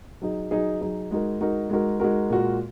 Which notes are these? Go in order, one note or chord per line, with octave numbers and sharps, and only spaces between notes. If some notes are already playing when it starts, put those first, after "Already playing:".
F#3 D#4 G#4
F#3 D#4 G#4
F#3 D#4 G#4
G#3 D#4 F#4 A#4
G#3 D#4 F#4 A#4
G#3 D#4 F#4 A#4
G#3 D#4 F#4 A#4
A#2 G#3 F#4 A#4